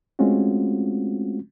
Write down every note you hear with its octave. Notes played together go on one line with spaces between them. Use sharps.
G#3 A3 C4 C#4 F4 F#4